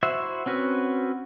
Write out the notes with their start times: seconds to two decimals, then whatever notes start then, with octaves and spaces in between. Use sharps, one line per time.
0.03 E4 F#4 C5 E5
0.46 C4 C#4 F#4 B4